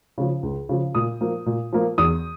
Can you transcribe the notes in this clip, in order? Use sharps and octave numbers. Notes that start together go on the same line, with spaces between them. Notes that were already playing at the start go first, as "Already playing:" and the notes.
C#3 F3
C#2
C#3 F3
A#2 D#6
F3 A#3
A#2
F3 A#3
E2 D#6